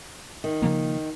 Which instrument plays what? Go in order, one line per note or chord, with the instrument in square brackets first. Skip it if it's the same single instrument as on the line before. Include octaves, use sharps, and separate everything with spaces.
[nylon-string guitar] D#3
[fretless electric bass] C#3 F3 A#3